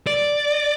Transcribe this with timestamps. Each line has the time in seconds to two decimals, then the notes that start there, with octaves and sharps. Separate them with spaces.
0.07 D5